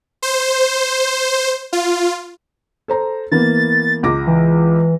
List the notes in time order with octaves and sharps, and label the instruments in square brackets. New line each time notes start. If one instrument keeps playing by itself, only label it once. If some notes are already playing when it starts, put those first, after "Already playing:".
[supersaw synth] C5
F4
[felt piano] A4 C5 A#5
[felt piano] E3 A#3 B3 [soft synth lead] A6
[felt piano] C#2 D6 A#6
[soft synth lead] E3